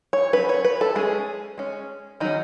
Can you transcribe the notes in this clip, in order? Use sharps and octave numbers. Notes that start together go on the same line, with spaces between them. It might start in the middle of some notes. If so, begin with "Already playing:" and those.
C#5
F#3 C#4 B4
C#5
B4
A4
G#3 C#4 G#4
G#3 C#4
D#3 F#3 C#4 D#4